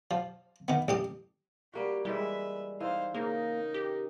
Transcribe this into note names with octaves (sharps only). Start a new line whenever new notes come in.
F3
D#3 B3
A1 G4 D#6
G3 A#3 F#4 G4
E3 G3 G#3 B4 E5
E3 D#4 C5 F5
C#3 A#3 D#4 A#4
G4